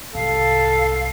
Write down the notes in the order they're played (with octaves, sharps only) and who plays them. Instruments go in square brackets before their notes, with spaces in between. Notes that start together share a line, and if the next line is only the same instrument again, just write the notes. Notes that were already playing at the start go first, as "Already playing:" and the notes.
[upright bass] C2 G#2 [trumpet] A4 [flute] F5